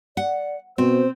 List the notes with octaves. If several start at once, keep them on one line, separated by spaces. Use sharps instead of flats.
D5 F#5
B2 C4 C5